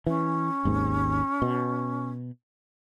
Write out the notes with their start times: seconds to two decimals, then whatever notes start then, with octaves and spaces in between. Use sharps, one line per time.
0.07 E3 C#4
0.65 G#1 D#2 G#2
1.42 B2